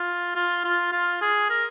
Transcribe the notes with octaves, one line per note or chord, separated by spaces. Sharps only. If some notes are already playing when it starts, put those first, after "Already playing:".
Already playing: F4
F4
F4
F4
G#4
A#4